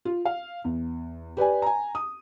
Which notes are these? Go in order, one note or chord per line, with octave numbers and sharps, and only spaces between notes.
F4
F5
E2
G4 B4 D5 G#5
G#5 A#5
D#6